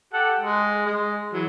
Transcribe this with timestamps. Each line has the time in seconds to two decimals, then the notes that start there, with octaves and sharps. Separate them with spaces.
0.13 G4 A4 F#5
0.40 G#3
0.86 G#3
1.33 E3 F#3